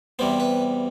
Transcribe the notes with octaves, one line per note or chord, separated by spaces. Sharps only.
E2 C3 G3 B3 C5
B4